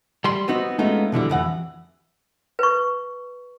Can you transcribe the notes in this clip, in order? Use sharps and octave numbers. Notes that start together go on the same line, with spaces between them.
G3 C6
B3 C4 D#4 F#4
G#3 A3 B3 C#4 D#4 F4
B2 D3 E3 G3
F2 E3 F#5
B4 C#6